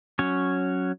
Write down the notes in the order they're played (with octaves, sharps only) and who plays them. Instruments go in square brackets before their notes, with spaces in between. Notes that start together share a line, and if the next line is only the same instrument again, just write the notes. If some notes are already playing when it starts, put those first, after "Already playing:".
[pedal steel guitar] F#3 C#4 C#5